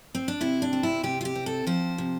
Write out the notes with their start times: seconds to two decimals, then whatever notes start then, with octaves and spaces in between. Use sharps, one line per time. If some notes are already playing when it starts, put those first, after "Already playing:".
0.15 C4
0.28 D4
0.41 C3 E4
0.62 D4
0.73 C4
0.83 E4
1.03 C3 G4
1.21 F4
1.25 G4
1.35 C4
1.46 A4
1.67 F3 C5
1.98 C3